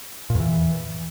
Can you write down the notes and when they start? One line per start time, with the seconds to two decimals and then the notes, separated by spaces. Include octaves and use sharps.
0.30 A#2
0.35 E2
0.40 E3